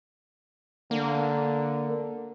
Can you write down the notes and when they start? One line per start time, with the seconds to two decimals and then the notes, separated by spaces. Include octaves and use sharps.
0.91 D3 A#3